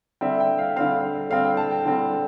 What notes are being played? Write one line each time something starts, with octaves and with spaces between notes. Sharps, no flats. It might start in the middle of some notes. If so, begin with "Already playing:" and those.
D3 G3 C4 E5
G5
F5
D3 G3 C4 F5
D3 G3 C4 F5
G5
A5
G5
D3 G3 C4